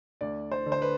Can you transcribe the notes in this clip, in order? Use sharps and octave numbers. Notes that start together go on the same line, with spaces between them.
D2 D5
C5
D3
C5
B4